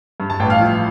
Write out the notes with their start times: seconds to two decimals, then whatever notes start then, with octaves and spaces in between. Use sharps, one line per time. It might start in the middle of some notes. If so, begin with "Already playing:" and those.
0.20 G2
0.30 A5
0.40 A1 G5
0.50 F5
0.60 F3